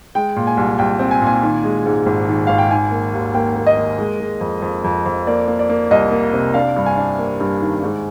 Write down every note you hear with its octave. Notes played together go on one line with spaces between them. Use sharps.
G#3 G5
A#2
G#5
C2
C2 G5
C4
G#5
A#2 G#5
D#3
G#3
G#2
G#1
D#3
G#1 F5
G5
D#3 G#5
A#3
D#2
A#3 G5
A#3
D#5
A#3
G#3
G#3
F2
F2
F2
F2
A#3 D5
A#3
D5
A#3
C2 D#5
A#3
C3
D4 F5
G2
G#5
D4
A#3
G2
D#3
G#2